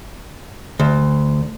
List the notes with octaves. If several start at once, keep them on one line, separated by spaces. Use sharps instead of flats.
D2